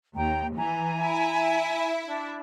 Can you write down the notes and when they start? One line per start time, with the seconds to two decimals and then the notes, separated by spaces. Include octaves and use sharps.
0.16 D#2 G5 A#5
0.56 E3 G#5 A#5
1.00 E4 E5
2.05 D4